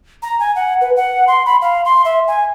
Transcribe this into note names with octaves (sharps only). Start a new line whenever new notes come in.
A#5
G#5
F#5
B4
F#5
C6
B5
F5
C6
E5
G#5